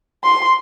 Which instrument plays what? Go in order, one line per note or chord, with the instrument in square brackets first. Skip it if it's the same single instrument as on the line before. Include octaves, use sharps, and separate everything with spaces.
[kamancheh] C6